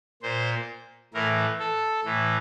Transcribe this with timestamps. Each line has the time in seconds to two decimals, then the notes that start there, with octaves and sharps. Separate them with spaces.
0.22 A#2 C5
1.14 A2 E3 A#4
1.59 A4
2.05 A2 E3